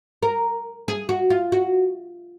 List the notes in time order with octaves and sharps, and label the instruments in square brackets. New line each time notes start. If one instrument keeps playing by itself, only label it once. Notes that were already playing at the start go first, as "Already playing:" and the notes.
[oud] A#4
G#4
F#4
F4
F#4